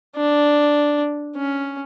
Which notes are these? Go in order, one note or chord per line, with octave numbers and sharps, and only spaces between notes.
D4
C#4